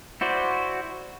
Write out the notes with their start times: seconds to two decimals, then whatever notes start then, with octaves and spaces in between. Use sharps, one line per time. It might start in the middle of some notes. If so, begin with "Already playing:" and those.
0.21 E4 F#4 C5 D5